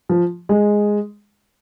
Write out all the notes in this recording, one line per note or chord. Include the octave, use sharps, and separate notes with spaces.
F3
G#3